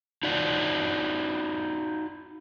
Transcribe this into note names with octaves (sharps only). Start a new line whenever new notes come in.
D#4 F4 F#4 D5